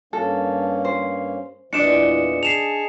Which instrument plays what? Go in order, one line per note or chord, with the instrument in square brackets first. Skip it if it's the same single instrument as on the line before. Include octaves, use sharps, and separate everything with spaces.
[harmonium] G2 A#3 C#4 [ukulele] A4
[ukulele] C5
[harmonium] E2 A#2 E3 [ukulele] D4 D#4 D5 [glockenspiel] C#7 E7
[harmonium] G#4 G#5 A5 [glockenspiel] C7 E7 F7